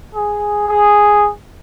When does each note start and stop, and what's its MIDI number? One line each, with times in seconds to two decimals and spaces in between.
0.15 0.68 68
0.69 1.29 68